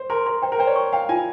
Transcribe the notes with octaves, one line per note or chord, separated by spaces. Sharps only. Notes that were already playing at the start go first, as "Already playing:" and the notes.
Already playing: C5
A#4 C6
A#4 C6
C5 G5
A#4
C5 G5
C#5
C#6
F5 G5
F4 G#5